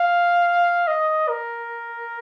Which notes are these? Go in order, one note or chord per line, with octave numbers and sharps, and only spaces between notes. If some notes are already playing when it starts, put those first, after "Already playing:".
Already playing: F5
D#5
A#4